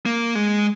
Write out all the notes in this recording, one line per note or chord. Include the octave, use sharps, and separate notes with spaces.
A#3
G#3